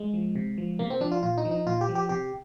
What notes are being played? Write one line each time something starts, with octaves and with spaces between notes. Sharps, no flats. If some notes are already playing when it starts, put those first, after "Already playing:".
Already playing: G#3
F3
C3
F3
C3 A#3
C4
F3 D4
F4
A#2 F4
D#4
F3
D#4
A#2 F4
G4
F3
G4
C3 G4